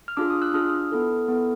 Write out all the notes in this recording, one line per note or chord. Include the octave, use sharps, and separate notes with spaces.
F6
D4 F4 G#4 D6 E6
D#6 F6
E6 F#6
D4 F4 G#4 D#6 F6
B3 E4 A4
B3 E4 A4